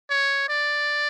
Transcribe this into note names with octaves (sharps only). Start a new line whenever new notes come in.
C#5
D5